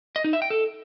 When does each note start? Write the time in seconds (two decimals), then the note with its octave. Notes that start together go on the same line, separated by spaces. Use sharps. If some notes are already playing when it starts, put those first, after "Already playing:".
0.16 D#5
0.24 D#4
0.33 E5
0.42 G5
0.50 A4